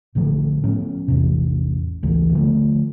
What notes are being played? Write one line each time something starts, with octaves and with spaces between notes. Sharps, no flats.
A#1 A2 D3 F3
A2 F3 B3 C#4
A1 E2 C3
A1 D2 C#3 E3
D3 F3 A3